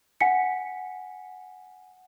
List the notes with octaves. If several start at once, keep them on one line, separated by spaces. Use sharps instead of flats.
F#5 G#5 B6 C#7